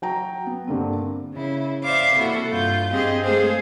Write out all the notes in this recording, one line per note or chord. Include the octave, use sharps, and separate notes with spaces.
F#3 G5 A#5
B3
G2 D3 A#3 C4
C#3 E4
C5 D5 E5 F5 D6
C3 A#3 E4 F#4 A4
G2 F4 F5 G6
G2 C4 G4 G#4 D#5 C6
G#3 A3 G#4 A4 C5 F5